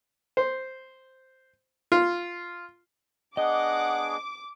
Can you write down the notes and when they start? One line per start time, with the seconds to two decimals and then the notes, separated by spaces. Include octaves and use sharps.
0.37 C5
1.92 F4
3.37 B3 D4 G#4 D#5 F#5 D6